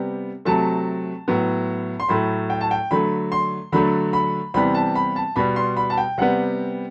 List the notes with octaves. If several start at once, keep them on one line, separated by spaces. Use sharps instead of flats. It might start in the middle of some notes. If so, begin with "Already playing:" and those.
Already playing: C3 G3 B3
C3 F#3 A3 A5
A2 F#3 B3
C6
A2 F#3 A3 B5
G5
A5
G5
D3 F#3 A3 B5
C6
D3 F#3 A3 B5
B5
C3 E3 G3 B3 B5
A5
B5
A5
B2 G3 B3 B5
C6
B5
A5
G5
C3 G3 B3 F#5